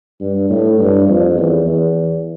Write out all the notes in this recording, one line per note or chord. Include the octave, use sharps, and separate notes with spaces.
G2
A2
G2
F2
E2
E2